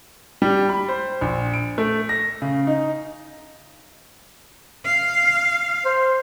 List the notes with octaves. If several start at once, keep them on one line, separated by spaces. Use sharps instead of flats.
G3
B5
C5
A#1
D7
A3
A#6
C#3
D#4
F5
C5